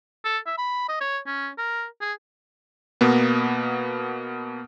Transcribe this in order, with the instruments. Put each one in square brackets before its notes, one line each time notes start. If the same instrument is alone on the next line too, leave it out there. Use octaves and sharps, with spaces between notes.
[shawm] A4
E5
B5
D#5
C#5
C#4
A#4
G#4
[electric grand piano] B2 A#3 B3